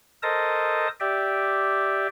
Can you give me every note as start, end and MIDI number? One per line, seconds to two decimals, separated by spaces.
0.23 0.88 69
0.23 0.88 70
0.23 0.88 72
0.23 0.88 75
0.23 0.88 81
0.23 0.88 87
1.00 2.07 67
1.00 2.07 74
1.00 2.07 76
1.00 2.07 79